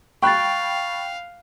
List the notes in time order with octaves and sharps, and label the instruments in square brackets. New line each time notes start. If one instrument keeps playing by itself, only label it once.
[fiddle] F5 [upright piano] G5 B5 F#6 [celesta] C#6 A6